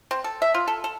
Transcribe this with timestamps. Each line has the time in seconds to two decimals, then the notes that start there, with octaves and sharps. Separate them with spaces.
0.11 C4
0.24 A4
0.42 E5
0.54 F4
0.68 A4
0.84 A4